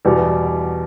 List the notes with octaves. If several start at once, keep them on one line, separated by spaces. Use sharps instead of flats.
E2 B2 G3